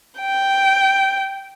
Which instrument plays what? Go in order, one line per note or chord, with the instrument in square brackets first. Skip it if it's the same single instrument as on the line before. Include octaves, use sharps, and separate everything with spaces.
[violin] G5